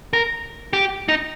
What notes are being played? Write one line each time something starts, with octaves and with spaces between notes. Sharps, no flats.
A#4
G4
D#4